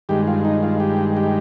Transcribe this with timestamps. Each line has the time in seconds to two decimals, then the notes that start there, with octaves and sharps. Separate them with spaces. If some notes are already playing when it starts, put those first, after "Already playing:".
0.09 G2 D#3 G#3 G4
0.27 F4
0.45 D#4
0.63 F4
0.80 G4
1.17 G4